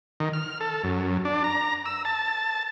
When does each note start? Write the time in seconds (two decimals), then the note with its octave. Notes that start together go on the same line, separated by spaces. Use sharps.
0.20 D#3
0.33 F6
0.60 A4
0.84 F#2
1.25 D4
1.44 A#5
1.86 E6
2.05 A5